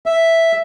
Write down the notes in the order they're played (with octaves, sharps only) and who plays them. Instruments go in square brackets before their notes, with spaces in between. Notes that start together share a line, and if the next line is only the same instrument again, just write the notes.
[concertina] E5